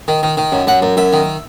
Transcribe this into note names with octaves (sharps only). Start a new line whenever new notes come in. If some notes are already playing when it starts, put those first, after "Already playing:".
D#3
D#3
D#3
F#2
F#2 F#5
F#2
F#2 E5
D#3